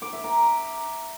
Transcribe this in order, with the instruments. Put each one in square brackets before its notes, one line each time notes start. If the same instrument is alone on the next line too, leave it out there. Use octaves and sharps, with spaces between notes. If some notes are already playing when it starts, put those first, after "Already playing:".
[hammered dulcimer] D6
E5
A#5